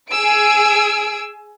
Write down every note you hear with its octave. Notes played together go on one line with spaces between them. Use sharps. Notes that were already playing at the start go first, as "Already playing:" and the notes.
G#4 G#5 E6 D7